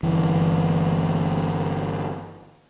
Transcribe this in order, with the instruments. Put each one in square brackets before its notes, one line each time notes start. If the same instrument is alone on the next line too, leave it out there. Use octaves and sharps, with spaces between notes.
[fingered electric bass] G1 E3